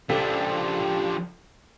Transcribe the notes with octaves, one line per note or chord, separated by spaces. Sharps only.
C#2 F3 D4 G4 A4 B6